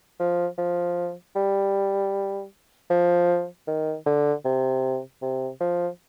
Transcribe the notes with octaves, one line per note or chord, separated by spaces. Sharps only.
F3
F3
G3
F3
D#3
D3
C3
C3
F3